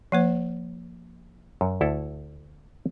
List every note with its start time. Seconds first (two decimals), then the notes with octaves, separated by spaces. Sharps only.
0.12 F3 A#3 C5
1.61 F#2
1.81 D2 E4 A4